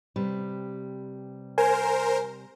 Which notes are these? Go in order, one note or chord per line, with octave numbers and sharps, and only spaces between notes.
C3 G3 B4
A#4 C5 G#5